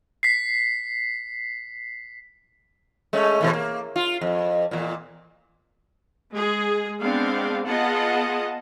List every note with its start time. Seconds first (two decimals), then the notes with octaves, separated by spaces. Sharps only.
0.23 B6 C7
3.13 G#3 A3 C#4
3.41 B2 E3 A3
3.53 A#3
3.96 F4
4.21 F2
4.71 E2 A#2
6.32 G#3 G#4
7.01 G#3 B3 C4 D4 F5
7.67 B3 F4 G#4 D#5 F#5 A5